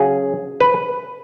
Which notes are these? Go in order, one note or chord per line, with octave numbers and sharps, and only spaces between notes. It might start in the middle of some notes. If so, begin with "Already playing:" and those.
Already playing: C#3 F#3 C#4 G#4
B4